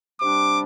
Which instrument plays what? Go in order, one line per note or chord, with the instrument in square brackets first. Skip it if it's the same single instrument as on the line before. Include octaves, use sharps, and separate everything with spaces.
[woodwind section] C3 G3 D4 G4 [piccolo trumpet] D6